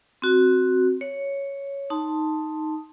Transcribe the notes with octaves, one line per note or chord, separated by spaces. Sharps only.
C4 F#4
C#5
D#4 A5 C6